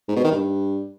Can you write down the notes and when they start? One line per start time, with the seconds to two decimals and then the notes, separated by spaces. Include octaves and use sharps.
0.08 G#2
0.16 B2
0.24 D#3
0.32 G2